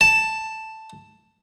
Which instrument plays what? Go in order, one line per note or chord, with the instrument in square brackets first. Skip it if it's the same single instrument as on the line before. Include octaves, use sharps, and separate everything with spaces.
[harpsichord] A5